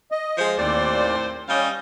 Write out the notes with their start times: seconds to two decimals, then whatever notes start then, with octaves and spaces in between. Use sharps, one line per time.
0.11 D#5
0.38 F3 G#3 C5
0.58 D#2 A2 C4 C5 D5
1.49 G3 C#4 D#5 F5